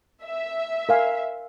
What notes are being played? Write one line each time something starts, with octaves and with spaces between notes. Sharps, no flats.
E5
A#4 F5 G#5